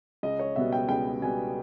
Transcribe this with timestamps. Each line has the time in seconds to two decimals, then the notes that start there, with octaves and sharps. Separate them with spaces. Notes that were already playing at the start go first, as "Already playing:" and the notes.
0.23 C#2 D#5
0.39 C#5
0.56 B2 G3 B3 E5
0.72 G5
0.89 C#2 G5
1.21 B2 G3 B3 G#5